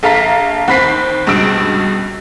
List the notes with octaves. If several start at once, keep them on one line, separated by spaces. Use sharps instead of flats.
A#1 A4 F5 A#5 B6
D#2 C4 B5 B6 C7
C#2 G2 B2 E6 D7